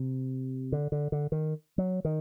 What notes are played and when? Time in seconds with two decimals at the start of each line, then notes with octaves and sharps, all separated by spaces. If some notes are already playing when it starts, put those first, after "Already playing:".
Already playing: C3
0.72 D3
0.92 D3
1.12 D3
1.32 D#3
1.78 F#3
2.05 D#3